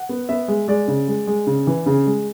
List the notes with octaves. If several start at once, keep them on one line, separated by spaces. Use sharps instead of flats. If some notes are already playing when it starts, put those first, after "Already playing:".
Already playing: F#5
B3
B3 E5
G#3
G#3 D5
C#3
G#3
G#3
C#3
E3
C#3
G#3